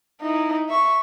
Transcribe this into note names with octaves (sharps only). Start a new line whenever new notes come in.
D#4 E4
E5 C#6